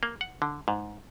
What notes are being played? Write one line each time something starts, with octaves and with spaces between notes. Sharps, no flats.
A#3
F#5
D3
G#2